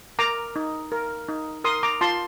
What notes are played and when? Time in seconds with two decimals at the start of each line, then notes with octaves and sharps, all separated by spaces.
0.19 A#4 A#5 D6
0.56 D#4
0.92 A#4
1.29 D#4
1.64 A#4 C6 D#6
1.83 A#5 D6
2.01 F4 A5 C6